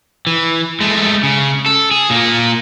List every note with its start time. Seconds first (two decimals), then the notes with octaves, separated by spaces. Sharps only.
0.27 E3
0.81 G#3 A3
1.23 C#3
1.66 A4
1.91 G#4
2.10 A#2 A#3